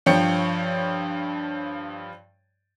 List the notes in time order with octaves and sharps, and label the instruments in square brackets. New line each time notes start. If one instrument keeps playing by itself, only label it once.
[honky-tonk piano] G2 F3 C#5 G5 C#7